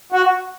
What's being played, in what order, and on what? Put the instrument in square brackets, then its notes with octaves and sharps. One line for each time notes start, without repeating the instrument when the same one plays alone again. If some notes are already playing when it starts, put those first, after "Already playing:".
[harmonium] F#4